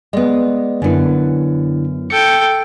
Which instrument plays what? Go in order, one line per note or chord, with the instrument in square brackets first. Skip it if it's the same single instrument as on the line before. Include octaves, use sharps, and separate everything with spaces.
[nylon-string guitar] G#3 B3 [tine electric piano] D5 D#5
[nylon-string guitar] F#2 B3 [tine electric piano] D3 D4 E4
[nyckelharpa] A4 G5 [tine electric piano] C#7